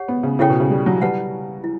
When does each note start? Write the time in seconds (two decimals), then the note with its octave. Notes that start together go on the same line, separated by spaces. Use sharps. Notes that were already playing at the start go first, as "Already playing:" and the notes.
Already playing: G4 C#5 F#5
0.08 B3
0.23 C#3
0.39 C#3 E4 A4 C#5 G5
0.50 B2
0.60 C#3
0.70 G3
0.86 F#3
1.01 G3 B4 F#5 A5
1.64 E4